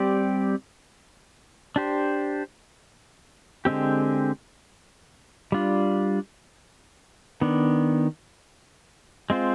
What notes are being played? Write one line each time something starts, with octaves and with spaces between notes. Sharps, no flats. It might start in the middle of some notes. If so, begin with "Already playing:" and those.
Already playing: G3 C4 G4 D5
D4 G4 C5
D3 G#3 C4 G4
G3 D4 F4
D#3 B3 D4
G#3 C4 F4 C5